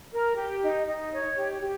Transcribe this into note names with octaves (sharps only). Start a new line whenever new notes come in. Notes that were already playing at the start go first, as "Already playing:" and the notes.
A#4
G4
D#4
D#4
C#5
G4
G4